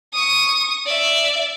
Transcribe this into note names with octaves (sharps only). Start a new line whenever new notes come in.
C#6 D#6
D5 E5